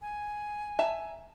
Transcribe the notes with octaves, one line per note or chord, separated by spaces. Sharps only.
G#5
E5 A5 A#5